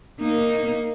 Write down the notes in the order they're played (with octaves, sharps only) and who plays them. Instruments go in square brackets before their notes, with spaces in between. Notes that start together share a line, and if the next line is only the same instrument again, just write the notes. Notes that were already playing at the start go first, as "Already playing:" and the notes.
[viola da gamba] A#3 D#4